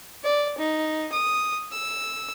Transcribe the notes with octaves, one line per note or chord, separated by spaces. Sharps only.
D5
D#4
D#6
E6